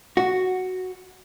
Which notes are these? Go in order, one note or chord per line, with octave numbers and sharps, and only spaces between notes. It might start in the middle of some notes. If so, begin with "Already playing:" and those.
F#4